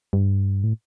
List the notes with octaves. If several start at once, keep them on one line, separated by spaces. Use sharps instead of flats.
G2
A2